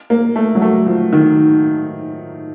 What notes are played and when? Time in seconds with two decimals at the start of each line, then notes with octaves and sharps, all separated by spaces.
0.10 A#3
0.36 A3
0.55 F#3
0.62 A3
0.86 F3
1.13 D#3